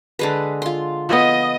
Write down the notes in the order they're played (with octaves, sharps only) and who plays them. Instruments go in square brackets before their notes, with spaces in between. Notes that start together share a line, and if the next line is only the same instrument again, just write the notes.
[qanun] D3 G#3 B4
F4 C6
[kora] F3 B3 [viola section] D#5